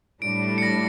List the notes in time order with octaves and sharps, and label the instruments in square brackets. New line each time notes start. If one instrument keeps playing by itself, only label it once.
[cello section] A2 G3 D4 [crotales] D7
[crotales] C#7
A#6